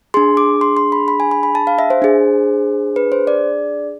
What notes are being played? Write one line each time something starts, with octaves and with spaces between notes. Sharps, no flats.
D4 G#4 C6
D6
C6
C6
B5
B5
G#5
B5
B5
A5
F5
E5
C5
D4 G#4
B4
C5
D5